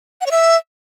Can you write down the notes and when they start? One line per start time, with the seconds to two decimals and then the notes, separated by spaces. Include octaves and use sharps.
0.21 F#5
0.26 C#5
0.31 E5